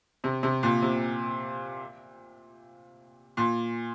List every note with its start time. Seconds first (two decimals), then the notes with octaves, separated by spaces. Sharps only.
0.24 C3
0.43 C3
0.63 A#2
0.82 C3
3.37 A#2